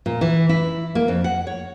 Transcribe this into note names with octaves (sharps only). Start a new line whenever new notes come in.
A#2
E3
E4
A#3
F2
F#5
C#5